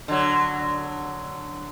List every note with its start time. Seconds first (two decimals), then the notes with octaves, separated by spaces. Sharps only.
0.08 D3 F#3